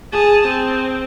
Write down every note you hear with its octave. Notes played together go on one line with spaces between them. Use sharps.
G#4 A5
C4